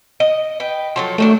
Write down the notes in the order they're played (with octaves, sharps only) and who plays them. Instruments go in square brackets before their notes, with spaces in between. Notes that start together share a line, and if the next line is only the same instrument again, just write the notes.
[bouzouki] D#5
B4 G5
F3 F#3 A4
[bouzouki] D#3 F#3 D4 [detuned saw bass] A3